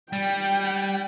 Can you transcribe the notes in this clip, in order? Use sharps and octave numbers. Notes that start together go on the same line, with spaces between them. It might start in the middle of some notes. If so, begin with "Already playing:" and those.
G3 G5